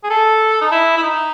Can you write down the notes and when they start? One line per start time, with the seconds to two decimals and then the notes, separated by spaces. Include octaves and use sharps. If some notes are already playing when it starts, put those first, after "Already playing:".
0.04 G#4
0.10 A4
0.61 D#4
0.72 E4
0.97 E4
1.03 D#4